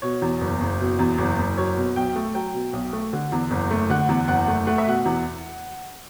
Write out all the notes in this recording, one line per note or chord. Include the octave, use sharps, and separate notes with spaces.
B2 C#5
E2
F#1
F#1
B2
E2
F#1
F#1
F#3 C#5
B2
B1 G5
A3
F#3 G5
B2
B1
A3
D3
E2
F#1
A3
D3 F#5
E2
F#1 F#5
A3
A3 F#5
E5
B2 F#5
E2